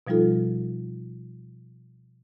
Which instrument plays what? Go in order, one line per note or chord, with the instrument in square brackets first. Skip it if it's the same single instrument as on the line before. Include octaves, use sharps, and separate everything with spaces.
[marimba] B2 F3 G3 D#4 F4 A4